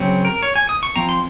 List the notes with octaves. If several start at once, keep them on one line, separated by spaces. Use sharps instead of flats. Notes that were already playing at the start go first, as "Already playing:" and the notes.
Already playing: C#3 F#3 C4
A#4
C#5
G#5
D#6
C#6
F3 C4 A#5
C6